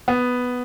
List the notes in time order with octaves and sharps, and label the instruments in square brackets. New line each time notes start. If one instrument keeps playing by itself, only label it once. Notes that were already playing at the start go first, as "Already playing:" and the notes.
[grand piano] B3